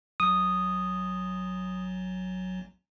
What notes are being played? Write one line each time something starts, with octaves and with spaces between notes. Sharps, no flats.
A1 F#3 D#6